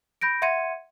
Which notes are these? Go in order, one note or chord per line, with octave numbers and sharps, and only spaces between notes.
B5 G6 A#6 D7
E5 F#5 C6 G#6 C#7 D#7